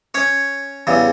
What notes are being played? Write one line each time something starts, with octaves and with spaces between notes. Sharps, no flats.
C#4 C#5
E2 C#3 G3